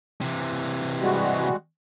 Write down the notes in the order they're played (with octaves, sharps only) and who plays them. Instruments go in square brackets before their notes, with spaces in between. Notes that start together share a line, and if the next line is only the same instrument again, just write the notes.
[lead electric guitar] C3 E3
[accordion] G3 G#3 F#4